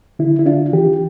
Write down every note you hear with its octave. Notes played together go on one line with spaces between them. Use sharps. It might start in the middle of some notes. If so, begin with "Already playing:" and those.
D3 E4
E4
D4 F4
E3 G4